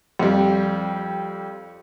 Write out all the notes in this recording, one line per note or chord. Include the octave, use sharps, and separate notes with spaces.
F2 G3